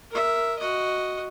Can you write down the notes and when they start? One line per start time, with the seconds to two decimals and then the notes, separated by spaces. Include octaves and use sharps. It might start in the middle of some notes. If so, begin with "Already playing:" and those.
0.11 A#4 E5
0.59 F#4 D#5